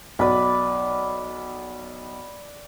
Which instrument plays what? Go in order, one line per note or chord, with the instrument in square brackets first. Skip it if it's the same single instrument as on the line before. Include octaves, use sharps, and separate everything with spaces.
[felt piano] B1 [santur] B4 D5 B5